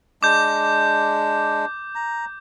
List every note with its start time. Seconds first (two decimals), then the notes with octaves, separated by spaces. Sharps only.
0.23 G#3 D4 D6 G6
1.95 A#5